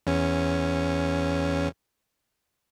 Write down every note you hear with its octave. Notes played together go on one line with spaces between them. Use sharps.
E2 C#4